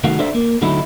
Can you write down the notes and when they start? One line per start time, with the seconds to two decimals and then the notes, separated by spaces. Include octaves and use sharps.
0.04 C2 D#3 A3 F#4 F5
0.19 D4 A4 C5 D5 E5
0.35 A#3
0.62 D3 F#3 A3 D#4 E4